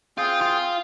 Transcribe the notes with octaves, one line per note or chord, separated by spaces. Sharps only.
C4 F4 G#4 G5
F4